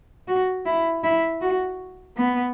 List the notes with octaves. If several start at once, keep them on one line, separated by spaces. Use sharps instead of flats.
F#4
E4
E4
F#4
B3